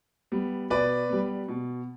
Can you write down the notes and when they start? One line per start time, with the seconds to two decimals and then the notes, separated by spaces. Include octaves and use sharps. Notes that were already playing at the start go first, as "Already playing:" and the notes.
0.32 G3 B3
0.70 B2 B4 D5
1.09 G3 B3
1.48 B2